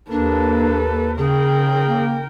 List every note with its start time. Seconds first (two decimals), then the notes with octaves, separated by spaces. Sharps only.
0.11 D#2 A#3 D4 A4 B4
1.18 C#3 G#4 A#4 G5
1.86 A#3